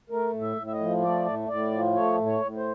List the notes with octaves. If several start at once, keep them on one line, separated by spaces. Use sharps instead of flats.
A3 A#4
A2
E5
A2
E5
D#5
F3
A3 D5
A2
A2 D5
F3
A3 C#5
A2
C#5
A2
C5